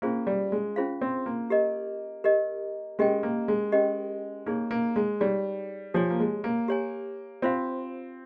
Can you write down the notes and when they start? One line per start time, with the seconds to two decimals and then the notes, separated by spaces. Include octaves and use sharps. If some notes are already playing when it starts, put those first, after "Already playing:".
0.02 A#3 C#4 F4 G#4 C5 F5
0.27 G3
0.52 G#3
0.76 C#4 F4 G#4 C5 F5
1.01 C4
1.26 A#3
1.50 G4 A#4 D#5
2.24 G4 A#4 D#5
2.99 G#3 C#4 G4 A#4 D#5 G5
3.23 A#3
3.48 G#3
3.72 C#4 G4 A#4 D#5 G5
4.46 A#3 D#4 G#4 C#5
4.71 A#3
4.96 G#3
5.20 G3 D#4 G#4 C#5
5.94 F3 G4 C#5 G#5
6.10 A#3
6.20 G#3
6.44 A#3
6.68 G4 C#5 G#5
7.42 C4 F4 C5 F5